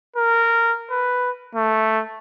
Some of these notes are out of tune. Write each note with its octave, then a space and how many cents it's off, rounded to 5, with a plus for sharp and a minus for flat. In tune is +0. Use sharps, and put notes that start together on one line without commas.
A#4 -15
B4 +5
A3 +0